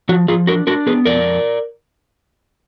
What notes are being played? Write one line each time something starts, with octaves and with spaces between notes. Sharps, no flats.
F3 F#4
F3 F4 G#4
D4 F#4 A#4
D4 F#4 A#4
B3 G#4 B4
F2 A#4 D5